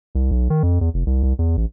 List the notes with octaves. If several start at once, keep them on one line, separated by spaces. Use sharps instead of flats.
C2
B1
D#3
F2
E2
F1
C2
C2
E2
A1